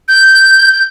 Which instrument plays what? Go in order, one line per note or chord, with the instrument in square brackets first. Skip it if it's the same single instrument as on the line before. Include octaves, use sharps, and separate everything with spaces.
[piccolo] G6